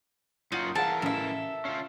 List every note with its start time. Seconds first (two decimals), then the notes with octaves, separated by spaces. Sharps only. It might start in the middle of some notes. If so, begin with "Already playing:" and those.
0.52 F#2 A#3 D#4 F4 F#4 F#5
0.75 E3 E4 G#4 A#4 F5 F#5 A5
1.02 A1 C#4 A4 E5 F5
1.65 C#4 F4 C7